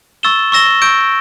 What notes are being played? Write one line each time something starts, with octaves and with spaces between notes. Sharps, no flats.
C#6 E6 A6 E7 G7
C#6 E6 A#6 E7 G7
C#6 E6 G6 D7